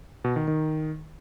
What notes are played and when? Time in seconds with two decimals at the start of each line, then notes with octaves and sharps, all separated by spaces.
0.24 B2
0.36 D#3
0.48 D#3